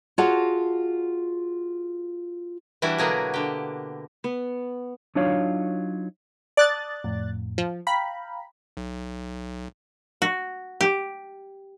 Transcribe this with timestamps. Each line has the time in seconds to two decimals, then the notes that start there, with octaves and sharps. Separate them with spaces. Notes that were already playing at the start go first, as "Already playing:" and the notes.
0.18 F4 F#4 G#4 C#5 F#5 A5
2.82 E3 G3 D4 E4 F#4
2.98 B2 D3 F#3 A#3 B3 G#4
3.34 D3 G4
4.24 B3
5.15 F#3 D4 D#4 F4 C#5 F5
6.57 D5 A5 D#6 F#6 A6
7.04 F2 A2
7.58 F3
7.87 F5 G5 A#5 B5
8.77 B1
10.22 F#4
10.81 G4